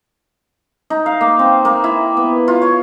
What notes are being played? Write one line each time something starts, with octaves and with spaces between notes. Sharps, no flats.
D#4
F5
A#3
C4
A#3
E4
B3
F4
C#5